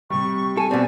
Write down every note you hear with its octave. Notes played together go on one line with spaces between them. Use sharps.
C3 G3 C#6
A4 G#5
B2 C4 D5